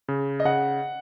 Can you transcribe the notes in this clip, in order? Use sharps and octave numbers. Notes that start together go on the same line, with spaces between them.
C#3
D#5
C#3 F#5